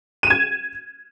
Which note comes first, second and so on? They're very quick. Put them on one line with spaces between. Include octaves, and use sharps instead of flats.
D#7 E7 G#6